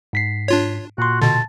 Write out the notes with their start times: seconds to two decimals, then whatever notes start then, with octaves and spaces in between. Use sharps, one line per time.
0.13 G#2 B6 C7
0.48 D4 F4 C#5
0.98 A#2 F#4 C6
1.22 B2 D3 A5